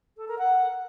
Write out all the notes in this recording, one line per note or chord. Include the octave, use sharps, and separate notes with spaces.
A4
A#4
F#5